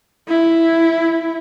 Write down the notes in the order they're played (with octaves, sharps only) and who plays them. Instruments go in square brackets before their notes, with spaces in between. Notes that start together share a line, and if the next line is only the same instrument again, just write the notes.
[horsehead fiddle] E4